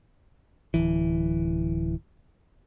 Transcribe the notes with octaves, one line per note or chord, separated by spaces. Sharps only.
D1 C2 E3